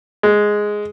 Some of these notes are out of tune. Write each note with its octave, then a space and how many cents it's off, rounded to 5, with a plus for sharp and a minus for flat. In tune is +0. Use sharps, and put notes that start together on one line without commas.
G#3 +0